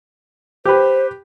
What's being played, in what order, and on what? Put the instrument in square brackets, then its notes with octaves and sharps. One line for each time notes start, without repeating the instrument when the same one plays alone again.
[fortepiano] G4 B4 [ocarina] C5